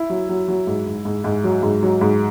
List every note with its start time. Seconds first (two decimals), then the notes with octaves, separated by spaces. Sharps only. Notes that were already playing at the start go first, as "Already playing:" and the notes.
Already playing: E4
0.10 F#3
0.29 F#3
0.48 F#3
0.67 G#2
0.87 G#2
1.05 G#2
1.24 G#2
1.44 F#3
1.63 G#2
1.83 F#3
2.01 G#2